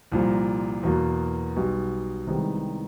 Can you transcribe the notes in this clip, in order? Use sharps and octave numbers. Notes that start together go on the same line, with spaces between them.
C2 A#2 F3
E2 B2 F#3 A#3
B1 B2 G3
C2 C3 D#3 G#3 B3